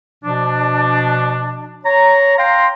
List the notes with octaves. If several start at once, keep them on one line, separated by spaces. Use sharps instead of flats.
B2 F3 D4
C#5 A#5
F5 G5 A#5 C6